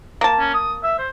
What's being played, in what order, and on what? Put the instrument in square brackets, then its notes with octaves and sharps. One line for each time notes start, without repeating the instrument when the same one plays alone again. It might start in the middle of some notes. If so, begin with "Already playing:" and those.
[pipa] A#3 A5
[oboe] C#4
D#6
E5
C5